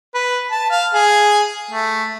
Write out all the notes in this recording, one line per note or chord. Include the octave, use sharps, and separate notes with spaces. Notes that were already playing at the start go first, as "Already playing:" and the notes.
B4
A5
F5
G#4
A3